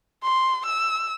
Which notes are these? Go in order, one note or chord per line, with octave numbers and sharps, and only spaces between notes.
C6
E6